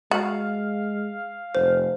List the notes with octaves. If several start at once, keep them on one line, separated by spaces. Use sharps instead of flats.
G#3 F#4 F5
F1 C5